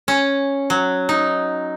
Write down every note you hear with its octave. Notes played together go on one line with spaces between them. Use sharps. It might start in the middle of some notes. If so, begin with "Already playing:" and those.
C#4
F#3
D#4